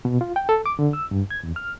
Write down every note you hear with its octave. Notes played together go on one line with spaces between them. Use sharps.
B2
F4
G5
A4
D6
D3
E6
G2
G#6
E2
F6